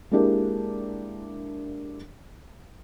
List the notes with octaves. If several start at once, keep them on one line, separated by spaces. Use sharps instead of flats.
G#3 A#3 D4 E4 G4 A#4